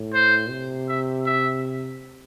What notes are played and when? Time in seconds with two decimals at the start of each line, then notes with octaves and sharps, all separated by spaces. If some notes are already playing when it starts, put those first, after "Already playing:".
Already playing: A2
0.14 C5
0.50 C3
0.88 E5
1.26 E5